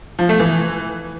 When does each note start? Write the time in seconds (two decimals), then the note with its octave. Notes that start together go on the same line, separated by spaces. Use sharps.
0.19 F3
0.29 A3
0.40 E3